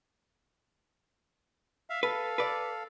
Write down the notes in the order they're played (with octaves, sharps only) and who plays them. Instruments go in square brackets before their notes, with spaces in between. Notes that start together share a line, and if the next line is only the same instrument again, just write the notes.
[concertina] E5 F5
[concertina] A4 F5 [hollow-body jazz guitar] B4
[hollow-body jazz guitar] B4 D5